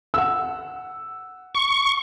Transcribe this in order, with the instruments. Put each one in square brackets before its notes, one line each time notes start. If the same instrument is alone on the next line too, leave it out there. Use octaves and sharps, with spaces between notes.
[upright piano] F#5 E6
[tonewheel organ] C#6